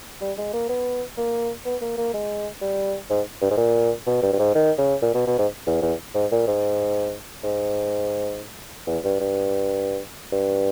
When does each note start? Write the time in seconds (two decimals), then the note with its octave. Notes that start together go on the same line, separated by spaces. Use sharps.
0.21 G3
0.38 G#3
0.53 A#3
0.69 B3
1.17 A#3
1.65 B3
1.82 A#3
1.97 A#3
2.14 G#3
2.62 G3
3.10 G#2
3.42 G2
3.51 G#2
3.57 A#2
4.06 B2
4.22 G2
4.33 G2
4.39 G#2
4.55 D#3
4.78 C#3
5.02 A#2
5.14 B2
5.27 B2
5.39 G#2
5.67 E2
5.82 E2
6.15 G#2
6.31 A#2
6.47 G#2
7.44 G#2
8.87 E2
9.04 G2
9.20 G2
10.32 G2